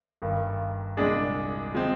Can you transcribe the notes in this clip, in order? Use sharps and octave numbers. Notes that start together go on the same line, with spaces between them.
G1 G2 D#3
C2 A#2 G#3 D4 G#4
F3 G#3 C4